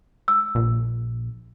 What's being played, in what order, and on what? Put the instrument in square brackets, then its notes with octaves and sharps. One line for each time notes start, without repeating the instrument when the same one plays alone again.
[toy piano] E6
[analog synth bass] A#1